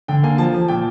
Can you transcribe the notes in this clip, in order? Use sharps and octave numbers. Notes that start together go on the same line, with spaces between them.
D3 G5
A#3 G#5
F3 A5
F3
A#2 G5